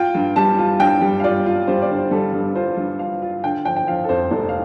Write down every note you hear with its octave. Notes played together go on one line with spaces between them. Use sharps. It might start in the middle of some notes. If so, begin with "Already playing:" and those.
Already playing: F4 G5
G2
G3 A5
F4
G2 G5
G3
F5
F4 D5
F4
G3 C5
D5
D3 C5
G3 A4
G2
F4 C5
G2
F4 F5
F4
D3 G5
F3 G5
G5
F3 F5
A4
F2 C5
F1 A4
F5